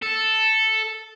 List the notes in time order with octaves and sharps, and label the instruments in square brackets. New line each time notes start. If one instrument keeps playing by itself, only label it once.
[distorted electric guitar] A4